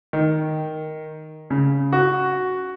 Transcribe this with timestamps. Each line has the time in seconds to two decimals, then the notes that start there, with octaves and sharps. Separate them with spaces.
0.13 D#3
1.50 C#3
1.93 F#4